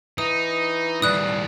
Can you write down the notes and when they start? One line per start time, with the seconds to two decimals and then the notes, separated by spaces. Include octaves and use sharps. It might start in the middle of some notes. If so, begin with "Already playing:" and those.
0.18 E3 D#4 D#6
1.02 D#2 A2 G3 D#6 F#6